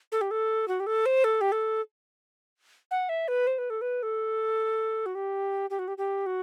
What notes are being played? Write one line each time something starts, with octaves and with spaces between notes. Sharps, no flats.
A4
G4
A4
F#4
G4
A4
C5
A4
G4
A4
F#5
E5
B4
C5
B4
A4
B4
A4
F#4
G4
G4
F#4
G4
G4
F#4